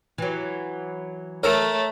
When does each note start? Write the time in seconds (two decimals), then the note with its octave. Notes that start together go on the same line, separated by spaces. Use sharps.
0.18 E3 F#3
1.43 A3 A4 A#4 C#5